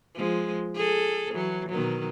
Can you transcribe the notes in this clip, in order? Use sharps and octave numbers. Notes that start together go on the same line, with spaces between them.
F3 G#3
G#4 A4
E3 F#3
B2 D#3 F#3